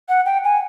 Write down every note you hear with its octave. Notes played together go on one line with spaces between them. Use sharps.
F#5
G5
G#5